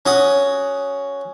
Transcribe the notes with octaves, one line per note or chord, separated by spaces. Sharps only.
C#4 F#4 D#6